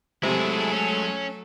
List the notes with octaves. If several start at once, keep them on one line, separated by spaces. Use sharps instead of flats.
C3 F#3 G#3 A3 E4 G#4 A4
C#4